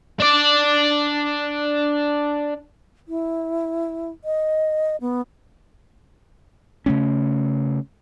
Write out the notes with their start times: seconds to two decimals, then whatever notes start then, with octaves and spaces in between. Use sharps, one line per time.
0.20 D4 D5
3.08 E4
4.24 D#5
5.01 B3
6.86 C#3 A3 C#4